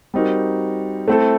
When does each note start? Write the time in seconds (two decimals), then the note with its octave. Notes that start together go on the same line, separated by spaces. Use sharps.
0.14 G3 C4 D#4 F#4 A#4
1.08 A3 C4 E4 A4